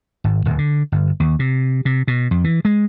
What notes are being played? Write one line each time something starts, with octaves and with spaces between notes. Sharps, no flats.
G#1
D1
D3
G1
D#2
C3
C3
B2
F2
E3
G#3